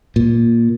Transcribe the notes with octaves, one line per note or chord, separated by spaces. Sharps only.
A#2